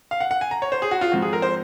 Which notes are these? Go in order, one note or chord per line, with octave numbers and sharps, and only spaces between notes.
F5
F#5
F#5
G#5
A#5
C#5
C5
G#4
F#4
F4
G#2 F3 C4 F#4
G#4
A#4
C5